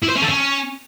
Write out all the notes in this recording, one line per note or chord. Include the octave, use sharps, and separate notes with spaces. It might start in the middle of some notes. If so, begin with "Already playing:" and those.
E4
C5
C#4
A4
C#4